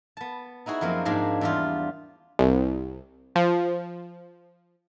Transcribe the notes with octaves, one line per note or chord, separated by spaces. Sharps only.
B3 A5
D#4 E4 F#4 G#4
F#2 F3 A#3 C4
G#2 G#3 A#3 D4
E2 G3 F4
C2
F3